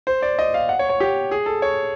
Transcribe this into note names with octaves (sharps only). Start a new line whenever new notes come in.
C5
D5
D#5
F5
F#5
C#5
C#5
G4
G#4
A4
C#5